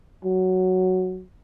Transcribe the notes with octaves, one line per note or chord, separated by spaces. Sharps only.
F#3